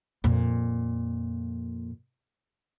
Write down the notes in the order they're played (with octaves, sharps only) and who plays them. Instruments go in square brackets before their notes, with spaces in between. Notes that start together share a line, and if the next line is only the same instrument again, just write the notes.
[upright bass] F2 A#2